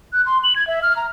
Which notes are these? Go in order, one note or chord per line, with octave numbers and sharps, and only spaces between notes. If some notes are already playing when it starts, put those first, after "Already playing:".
F#6
C6
F#7
G#6
E5
F6
A#5